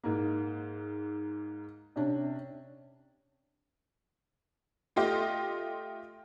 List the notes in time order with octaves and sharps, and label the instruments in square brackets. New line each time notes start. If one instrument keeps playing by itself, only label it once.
[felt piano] G#2 A#3
C3 C#4 D4
[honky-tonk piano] A3 F4 G4 D#5